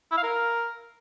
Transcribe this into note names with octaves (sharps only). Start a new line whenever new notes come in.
E4
F5
A#4